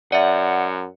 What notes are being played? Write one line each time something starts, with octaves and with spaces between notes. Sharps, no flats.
F#2 D5 E5 F#5